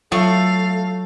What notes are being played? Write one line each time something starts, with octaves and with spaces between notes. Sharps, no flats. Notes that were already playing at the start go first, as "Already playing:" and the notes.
F#3 A3 F4 A4 C#5 F5